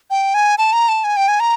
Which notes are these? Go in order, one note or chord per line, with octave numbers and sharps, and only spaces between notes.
G5
G#5
A5
A#5
A5
G#5
G5
G#5
A#5